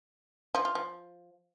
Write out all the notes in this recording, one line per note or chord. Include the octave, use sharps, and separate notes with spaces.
F3
F4
F3